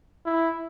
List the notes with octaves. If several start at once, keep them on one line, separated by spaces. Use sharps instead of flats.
E4